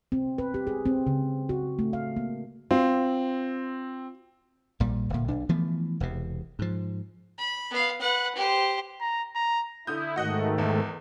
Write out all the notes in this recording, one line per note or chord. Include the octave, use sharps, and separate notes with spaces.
C4
B4
G4
G#4
C4
C#3
F#4
A3
F5
A#3
C4 F4
A#1 A#2 G3
D1 A#2
B1 D4
E3 F3 A3 B3
E1 E2 C3
G#2 F3
B5
B3 F5
B4 F#5
G4 C5
A#5
A#5
D3 E4 D#6 G6
G#2 D#3 A3 F#4 D#5 F#5
E2